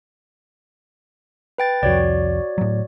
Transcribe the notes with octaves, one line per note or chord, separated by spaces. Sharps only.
B4 G5 A6
C2 F2 F#4 C#5 D5
A2 F#3